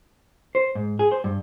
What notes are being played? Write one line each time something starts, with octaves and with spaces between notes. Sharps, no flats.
C5
G#2
G#4
C5
G2